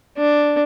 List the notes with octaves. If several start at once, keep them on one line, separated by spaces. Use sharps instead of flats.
D4